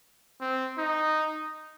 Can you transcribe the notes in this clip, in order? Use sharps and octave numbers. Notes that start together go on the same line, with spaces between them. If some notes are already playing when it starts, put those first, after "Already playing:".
C4
D#4